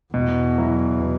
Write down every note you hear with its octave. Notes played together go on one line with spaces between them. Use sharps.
E2 B2
F#3 E4
B2